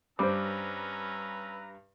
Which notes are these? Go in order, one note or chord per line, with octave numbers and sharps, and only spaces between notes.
G2 G3 C#4 B4 C5 A#5 D6 E6